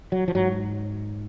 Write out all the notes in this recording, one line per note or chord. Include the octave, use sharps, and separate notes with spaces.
F#3
F3
G#2 F#3